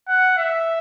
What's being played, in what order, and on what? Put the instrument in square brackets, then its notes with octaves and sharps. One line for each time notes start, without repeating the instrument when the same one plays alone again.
[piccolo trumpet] F#5
E5